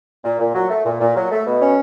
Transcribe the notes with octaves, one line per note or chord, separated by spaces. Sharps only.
A#2
A#2
F#3
A3
A#2
A#2
F#3
A3
B2
C#4